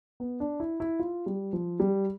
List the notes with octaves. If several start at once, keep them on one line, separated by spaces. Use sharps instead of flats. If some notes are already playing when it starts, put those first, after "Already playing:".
B3
D4
E4
E4
F4
G3
F3
G3